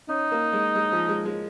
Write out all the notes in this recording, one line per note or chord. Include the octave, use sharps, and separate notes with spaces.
C#4 D#4
A#3
G#3
G#3
F3
G#3
G#3